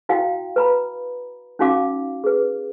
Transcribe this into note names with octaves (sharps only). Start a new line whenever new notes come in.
E4 F#4 F5 G5
B4 A#5 B5
C#4 D#4 F#4 F5 D6
G#4 B4